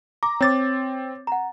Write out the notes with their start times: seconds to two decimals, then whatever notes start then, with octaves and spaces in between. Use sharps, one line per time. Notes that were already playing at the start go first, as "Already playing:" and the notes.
0.23 A#5 D6
0.41 C4 C#5 D6 A6
1.27 F#5 A#5